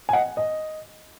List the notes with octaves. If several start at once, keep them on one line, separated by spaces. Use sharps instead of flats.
G#5
D#5 F#5
D#5